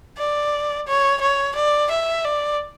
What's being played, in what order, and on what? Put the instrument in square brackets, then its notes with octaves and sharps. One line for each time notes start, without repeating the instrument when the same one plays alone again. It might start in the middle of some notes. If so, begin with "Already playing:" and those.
[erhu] D5
C#5
C#5
D5
E5
D5